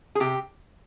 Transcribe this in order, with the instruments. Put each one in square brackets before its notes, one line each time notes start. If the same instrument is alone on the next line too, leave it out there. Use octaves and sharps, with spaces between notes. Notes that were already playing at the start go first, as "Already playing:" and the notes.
[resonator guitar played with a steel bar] G#4
C3 G4